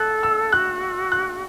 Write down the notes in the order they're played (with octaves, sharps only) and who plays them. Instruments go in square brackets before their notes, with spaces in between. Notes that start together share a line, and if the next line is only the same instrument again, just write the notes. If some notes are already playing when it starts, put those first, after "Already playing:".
Already playing: [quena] A4 [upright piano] F#6
[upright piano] E6
[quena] F#4 [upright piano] F#6
[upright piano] F#6